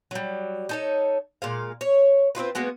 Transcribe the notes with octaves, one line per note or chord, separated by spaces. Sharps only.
F#3 G3
D#4 A4 C#5
A#2 G#3 F5
C#5
C4 D#4 F4 B4
G#3 A#3 B3 F#4